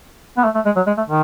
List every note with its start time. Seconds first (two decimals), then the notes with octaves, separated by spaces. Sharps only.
0.37 B3
0.44 A3
0.55 A3
0.66 G#3
0.76 F#3
0.87 G#3
0.97 A3
1.08 D#3